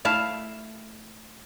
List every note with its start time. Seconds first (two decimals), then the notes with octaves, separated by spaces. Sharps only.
0.05 A3 E4 F5 A5